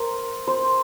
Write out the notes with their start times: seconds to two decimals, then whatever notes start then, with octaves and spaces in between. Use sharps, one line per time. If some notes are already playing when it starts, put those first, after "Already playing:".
Already playing: A#4 C5
0.47 C5